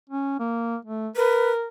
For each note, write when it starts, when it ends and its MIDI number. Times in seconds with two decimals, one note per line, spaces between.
0.09 0.37 61
0.39 0.76 58
0.85 1.08 57
1.16 1.68 70
1.16 1.51 71